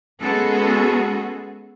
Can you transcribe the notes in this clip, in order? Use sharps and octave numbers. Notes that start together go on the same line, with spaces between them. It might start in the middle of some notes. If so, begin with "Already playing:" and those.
G#3 B3 C#4 F#4 G#4 A4